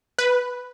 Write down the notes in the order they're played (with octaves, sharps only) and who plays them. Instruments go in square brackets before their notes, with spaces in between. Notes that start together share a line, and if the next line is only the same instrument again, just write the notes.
[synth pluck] B4